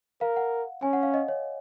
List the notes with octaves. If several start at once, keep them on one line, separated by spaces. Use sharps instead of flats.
A#4 F5
F#5
C#4 G#5
F#5
F5
D#5
C#5